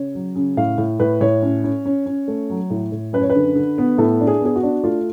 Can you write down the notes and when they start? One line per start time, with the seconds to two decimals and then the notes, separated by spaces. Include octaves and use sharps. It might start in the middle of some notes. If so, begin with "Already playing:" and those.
Already playing: C#3 C#5
0.15 F#3
0.35 C#3
0.57 A2 F5
0.78 A2
1.00 A2 B4
1.21 A2 C#5
1.42 C#4
1.64 C#4
1.85 C#4
2.06 C#4
2.28 A3
2.50 F#3
2.70 A2
2.92 A2
3.13 F#2 B4
3.22 C#5
3.29 B4
3.35 D3
3.55 D3
3.78 B3
3.98 A2 A4
4.21 D4
4.27 G#4
4.41 B3 G#4
4.56 F#4
4.63 D4
4.84 A3 F4